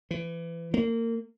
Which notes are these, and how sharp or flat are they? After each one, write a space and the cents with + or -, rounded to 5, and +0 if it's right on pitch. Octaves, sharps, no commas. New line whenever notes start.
E3 +25
A#3 -25